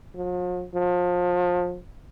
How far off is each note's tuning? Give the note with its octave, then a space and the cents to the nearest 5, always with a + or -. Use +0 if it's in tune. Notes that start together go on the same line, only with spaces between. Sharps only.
F3 +45
F3 +30